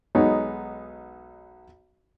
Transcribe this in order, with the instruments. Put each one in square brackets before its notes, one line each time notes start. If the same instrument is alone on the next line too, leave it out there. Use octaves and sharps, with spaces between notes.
[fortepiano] B1 G#3 B3 D#4 C#5